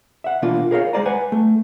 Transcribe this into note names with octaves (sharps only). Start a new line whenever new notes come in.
E5 F#5
B2 E3 A#3 D4 F4
G#4 A#4 C#5 F5
G#3 G#4 C5 D5 G#5 A#5
B4 F#5 G#5
A3